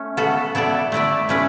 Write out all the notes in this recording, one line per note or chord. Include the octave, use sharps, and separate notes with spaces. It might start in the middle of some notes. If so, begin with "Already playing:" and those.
Already playing: A3 C#4
B3 F#4 A4
B3 E4 A4 D5
A3 E4 B4 D5
A3 C#4 E4 B4 D5